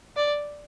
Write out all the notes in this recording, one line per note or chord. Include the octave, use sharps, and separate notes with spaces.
D5